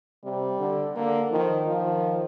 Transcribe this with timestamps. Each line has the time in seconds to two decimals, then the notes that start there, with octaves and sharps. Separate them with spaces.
0.24 C3 G3
0.60 D3
0.96 D3 A#3
1.31 D#3 F3
1.66 D#3 F3